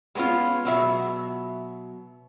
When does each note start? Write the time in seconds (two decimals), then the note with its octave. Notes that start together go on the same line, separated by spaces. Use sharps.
0.15 G#3 A3 B3 C#4 F4
0.65 B2 F#3 E5